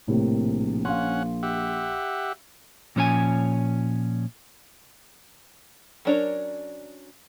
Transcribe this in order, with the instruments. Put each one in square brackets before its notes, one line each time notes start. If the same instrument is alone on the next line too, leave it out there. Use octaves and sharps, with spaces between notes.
[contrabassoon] A#1 [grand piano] A2 C3 A#3
[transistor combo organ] C#4 F#5 [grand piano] F5 C6
[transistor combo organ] G4 E5 F#5
[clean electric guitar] A#2 F3 C#4 C5 C#5 G#5
[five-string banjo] F#3 C#4 D4 A#4 C#5